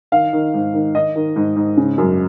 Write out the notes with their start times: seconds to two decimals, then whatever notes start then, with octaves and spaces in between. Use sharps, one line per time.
0.12 D#3 F5
0.33 D#3
0.54 G#2
0.74 D#3
0.95 D#3 D#5
1.16 D#3
1.36 G#2
1.56 G#2
1.77 C#3
1.98 F#2